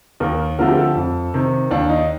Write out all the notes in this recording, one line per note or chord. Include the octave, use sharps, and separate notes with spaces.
D#2 A#4
D3 F3 A3 C4 A#4
G4
A4
F2
C3 D#3
D#2 D4
D#4